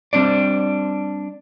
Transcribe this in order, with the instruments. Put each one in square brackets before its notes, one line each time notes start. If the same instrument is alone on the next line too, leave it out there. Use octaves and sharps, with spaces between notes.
[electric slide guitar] G3 C4 D4 D5